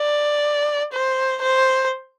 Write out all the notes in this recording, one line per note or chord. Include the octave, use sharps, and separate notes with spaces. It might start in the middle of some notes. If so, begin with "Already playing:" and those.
Already playing: D5
C5
C5